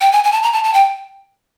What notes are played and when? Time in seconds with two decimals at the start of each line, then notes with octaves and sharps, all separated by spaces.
0.01 G5
0.12 G#5
0.24 G#5
0.32 A5
0.43 A#5
0.53 A5
0.64 A5
0.73 G5